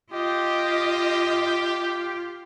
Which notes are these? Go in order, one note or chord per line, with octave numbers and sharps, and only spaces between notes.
F4 G4 D#5